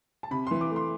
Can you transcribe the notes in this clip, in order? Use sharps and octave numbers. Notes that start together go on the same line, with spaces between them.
A5
C3 B5
E3 C6
D6
A3
C6